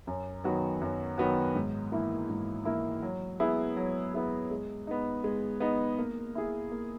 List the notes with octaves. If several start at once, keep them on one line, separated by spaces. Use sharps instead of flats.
F#2
D#3 F#3 B3 F#4
F#2
D#3 F#3 B3 F#4
G#2
E3 A#3 E4
G#2
E3 A#3 E4
F#3
B3 E4 G#4
F#3
B3 E4 G#4
G#3
B3 D#4
G#3
B3 D#4
A#3
E4 G#4
A#3